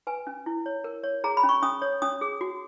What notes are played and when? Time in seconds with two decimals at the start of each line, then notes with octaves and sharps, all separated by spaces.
0.07 B4 G#5
0.27 C#4
0.46 E4
0.66 C#5
0.84 A#4
1.03 C#5
1.24 G#4 A#5
1.37 B5
1.43 C#4
1.49 C#6
1.62 C#4 D#6
1.82 C#5
2.02 C#4 D#6
2.21 G#4
2.41 F#4